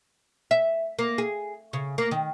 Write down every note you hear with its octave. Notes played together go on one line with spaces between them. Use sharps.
E5
A#3
G#4
C#3
A#3
D#3